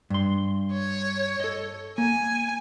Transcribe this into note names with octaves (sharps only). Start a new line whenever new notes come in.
G2 C6
C#5
A4 D#5
A#3 G#5